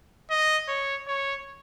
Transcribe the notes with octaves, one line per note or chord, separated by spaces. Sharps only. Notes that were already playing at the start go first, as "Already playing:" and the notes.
D#5
C#5
C#5